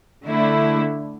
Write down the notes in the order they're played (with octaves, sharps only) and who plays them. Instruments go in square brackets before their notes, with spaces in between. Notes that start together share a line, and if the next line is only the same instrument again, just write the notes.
[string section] D3 A3 E4